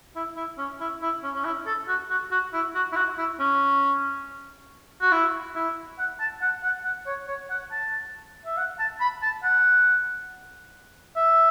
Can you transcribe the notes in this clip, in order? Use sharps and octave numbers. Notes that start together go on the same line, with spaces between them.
E4
E4
C#4
E4
E4
C#4
C#4
E4
A4
F#4
F#4
F#4
E4
F#4
E4
F#4
E4
C#4
F#4
E4
E4
F#5
A5
F#5
F#5
F#5
C#5
C#5
F#5
A5
E5
F#5
A5
B5
A5
F#5
E5